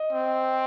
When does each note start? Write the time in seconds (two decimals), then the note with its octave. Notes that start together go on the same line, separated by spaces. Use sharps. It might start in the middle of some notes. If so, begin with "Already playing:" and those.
Already playing: D#5
0.13 C4